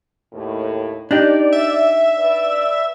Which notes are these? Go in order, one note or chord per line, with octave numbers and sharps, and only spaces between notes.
D#2 A2
D4 D#4 G4 D5
E5
B4 D5